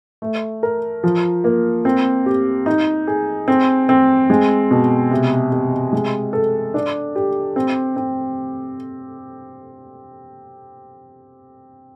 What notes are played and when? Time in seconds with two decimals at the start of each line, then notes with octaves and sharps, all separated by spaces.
0.22 A3
0.63 A#4
1.04 F3
1.44 A#3
1.85 C4
2.26 G4
2.66 D#4
3.07 G#4
3.48 C4
3.89 C4
4.30 G#3
4.71 B2
5.11 C3
5.52 C3
5.93 G#3
6.33 A4
6.74 D4
7.16 G4
7.56 C4
7.96 C4